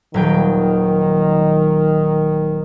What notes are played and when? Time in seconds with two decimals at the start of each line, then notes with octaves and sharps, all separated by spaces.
0.14 D#1 D#3 F#3 G5